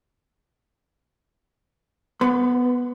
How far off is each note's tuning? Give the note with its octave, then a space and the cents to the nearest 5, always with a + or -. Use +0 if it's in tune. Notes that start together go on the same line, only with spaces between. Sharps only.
B3 +0 B5 +35